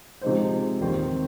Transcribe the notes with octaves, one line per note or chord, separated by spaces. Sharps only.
C3 F3 G#3 D#4 C5
D#2 D#3 C4